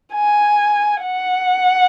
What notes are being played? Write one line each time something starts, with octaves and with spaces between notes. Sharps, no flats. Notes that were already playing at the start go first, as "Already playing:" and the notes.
G#5
F#5